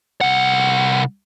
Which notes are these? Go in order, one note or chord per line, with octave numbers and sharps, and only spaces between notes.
C2 F#5